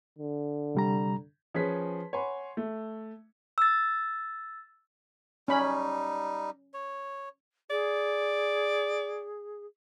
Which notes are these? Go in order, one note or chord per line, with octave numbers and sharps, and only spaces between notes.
D3
C3 G3 A#5
F3 C#4 G#4 B4 B6
C#5 F#5 G#5 B5 C6
A3
E6 A6
G3 C#4 D#4 B5
C#5
G#4 D5